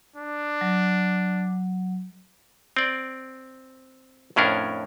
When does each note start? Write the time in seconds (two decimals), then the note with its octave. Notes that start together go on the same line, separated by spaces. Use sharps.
0.16 D4
0.61 F#3
2.77 C4 D5
4.36 F2 A2 C#4 D4 A#4